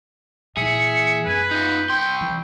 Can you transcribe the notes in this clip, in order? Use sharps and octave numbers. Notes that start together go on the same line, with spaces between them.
A#2 E3 G#4 E5 C#7
F#2 B3 B4 G#5
D#4 F4 G6
C2 G5 C6
E3